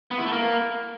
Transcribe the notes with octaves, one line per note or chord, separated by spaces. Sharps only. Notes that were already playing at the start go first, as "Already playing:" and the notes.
B3
E4
A3
A#3